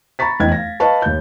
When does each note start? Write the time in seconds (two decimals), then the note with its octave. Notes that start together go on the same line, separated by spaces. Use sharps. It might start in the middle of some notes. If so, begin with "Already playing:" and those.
0.19 A#5 B5 C#6 A6 B6
0.40 F1 E2 E3 D#5 G5 G#6
0.52 F5 A#6
0.80 B4 D#5 F5 A5 C#6
1.02 D#2 G6